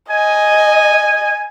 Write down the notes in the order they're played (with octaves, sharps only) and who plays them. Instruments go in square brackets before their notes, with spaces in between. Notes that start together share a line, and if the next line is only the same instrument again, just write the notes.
[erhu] D#5 [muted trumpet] G#5